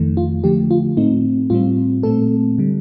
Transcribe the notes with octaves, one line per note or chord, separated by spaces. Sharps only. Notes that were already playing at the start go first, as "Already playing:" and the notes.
Already playing: F2 D#3 A3
F4
D3 F3 A3 G4
F4
A2 A3 C4 D#4
A2 G3 C4 F4
A#2 A3 C4 A4
D3 G3